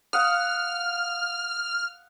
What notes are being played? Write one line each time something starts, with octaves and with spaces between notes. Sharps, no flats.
F5 F#5 D#6 F6